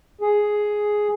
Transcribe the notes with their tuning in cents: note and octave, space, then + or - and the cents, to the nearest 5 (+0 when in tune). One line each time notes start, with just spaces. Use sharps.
G#4 +5